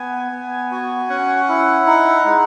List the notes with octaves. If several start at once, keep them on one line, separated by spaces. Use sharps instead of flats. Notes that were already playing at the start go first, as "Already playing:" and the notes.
Already playing: B3 G#5
B3
F#4
C#4 F#5
E4
D#4
G#3